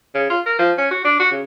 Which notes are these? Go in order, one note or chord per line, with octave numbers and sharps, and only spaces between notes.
C#3
F4
A#4
F3
C#4
F#4
D4
F#4
C#3